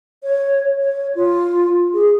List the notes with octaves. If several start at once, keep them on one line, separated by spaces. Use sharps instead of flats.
C#5
C#5
F4
G#4